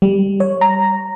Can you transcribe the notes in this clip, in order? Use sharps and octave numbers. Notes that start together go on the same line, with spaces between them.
G3
C#5
A#5